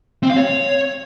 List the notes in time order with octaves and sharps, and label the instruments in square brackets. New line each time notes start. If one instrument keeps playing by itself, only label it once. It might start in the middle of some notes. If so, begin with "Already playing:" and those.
[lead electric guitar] C4
F5
C#5